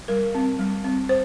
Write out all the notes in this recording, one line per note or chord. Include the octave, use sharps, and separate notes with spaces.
G3 A#4
C4
G3
C4
C5